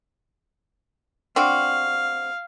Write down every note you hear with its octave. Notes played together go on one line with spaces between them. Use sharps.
C4 D4 F#4 F5